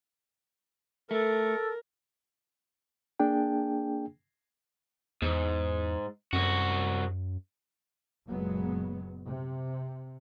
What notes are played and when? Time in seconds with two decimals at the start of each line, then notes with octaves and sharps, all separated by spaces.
1.11 A3 A4 A#4
3.20 A#3 D4 G#4 G5
5.22 E2 G#2
6.33 C2 F#2 F#4
8.27 F#1 A#2 F#3 G#3 B3
9.25 C3